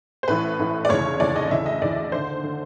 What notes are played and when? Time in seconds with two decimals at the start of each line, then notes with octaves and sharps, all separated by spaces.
0.23 C5
0.28 A1 A2 E3 B4
0.59 A1 A2 E3
0.85 D5
0.89 F1 D#2 C#3 E3 C#5
1.20 F1 D#2 C#3 E3 D5
1.36 D#5
1.51 D2 C#3 E3 E5
1.66 D#5
1.82 D2 C#3 E3 D5
2.12 D#2 D3 C5
2.43 D3